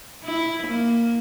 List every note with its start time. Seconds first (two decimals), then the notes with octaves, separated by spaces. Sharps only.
0.24 E4
0.66 A#3